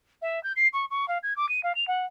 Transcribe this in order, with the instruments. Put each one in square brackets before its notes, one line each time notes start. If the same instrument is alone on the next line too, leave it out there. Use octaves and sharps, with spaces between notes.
[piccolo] E5
G6
C7
C#6
C#6
F5
G#6
D6
D#7
F5
F7
F#5